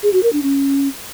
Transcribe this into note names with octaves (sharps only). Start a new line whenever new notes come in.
G#4
F#4
A#4
D4
C#4